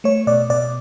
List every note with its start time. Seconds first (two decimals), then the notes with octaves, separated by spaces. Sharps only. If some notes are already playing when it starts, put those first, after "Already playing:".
0.04 A3 C#5
0.27 B2 D5
0.50 B2 D5